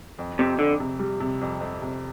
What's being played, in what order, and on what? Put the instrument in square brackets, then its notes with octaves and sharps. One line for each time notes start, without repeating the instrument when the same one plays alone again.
[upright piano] F2
[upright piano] F2 [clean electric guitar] C3
[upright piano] F2 [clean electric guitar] D3
[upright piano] C3
G3
C3
F2
F2
C3